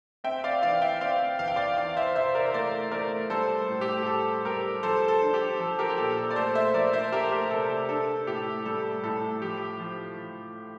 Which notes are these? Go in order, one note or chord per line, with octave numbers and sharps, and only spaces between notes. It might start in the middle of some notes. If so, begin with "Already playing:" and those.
C4 E5 G5
D5 F5
E3 D5 F5
E5 G5
C4 D5 F5
E2 F5
G5
D5 F5
E3 D5 F5
C5 E5
C3 C5 E5
A#4 D5
C5
A3 A#4 D5
A3 A#4 D5
G3 A4 C5
A2
G4
G4
G3 A4
G3 G4 A#4
F3 A4 C5
A4
D4
G4
F3 A4
G4 A#4
G4
A#2 A4
A4
D5
A3 A4 C5
C5 E5
F3 A#4 D5
C5 E5
A3 G4 A#4
G4 A#4
C3 A4
G4
D4 A4
A2 G4
G3 A4
A2 A4
F3 G4
F3
F3